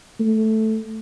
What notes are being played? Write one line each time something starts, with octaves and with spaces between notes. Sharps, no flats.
A3